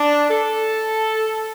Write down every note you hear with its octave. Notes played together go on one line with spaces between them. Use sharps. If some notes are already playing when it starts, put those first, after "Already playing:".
Already playing: D4
A4